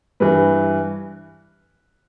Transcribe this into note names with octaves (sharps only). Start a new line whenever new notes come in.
G2 E3 B4